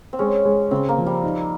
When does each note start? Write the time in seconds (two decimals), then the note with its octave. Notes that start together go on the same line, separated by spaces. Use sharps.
0.13 C4
0.19 G#3 C#4
0.45 G#3
0.71 C#3 C4
0.89 A#3
0.98 F3
1.06 G3
1.24 D#4